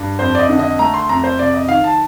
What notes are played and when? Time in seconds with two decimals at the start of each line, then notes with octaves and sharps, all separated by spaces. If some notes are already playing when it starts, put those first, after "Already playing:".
Already playing: G2
0.19 F2 C5
0.35 D5
0.39 D#5
0.49 D3
0.59 D#5
0.79 A3 A#5
0.94 C6
1.09 F2 A#5
1.24 C5
1.38 C3 D5
1.54 D#5
1.68 D#3 F5
1.84 A5